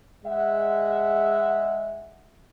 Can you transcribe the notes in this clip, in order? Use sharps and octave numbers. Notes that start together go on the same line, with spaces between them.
G#3 E5 F#5